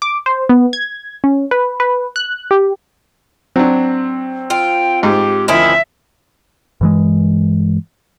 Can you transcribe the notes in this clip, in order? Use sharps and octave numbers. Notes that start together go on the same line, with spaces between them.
D6
C5
B3
G#6
C#4
B4
B4
F#6
G4
F#3 C4 D4
F4 G5
G#2 G4
D2 D#3 F3 C#4 E4 E5
G2 E3 G#3